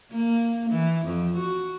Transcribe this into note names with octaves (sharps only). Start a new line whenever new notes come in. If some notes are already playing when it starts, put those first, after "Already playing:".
A#3
E3
F2
F#4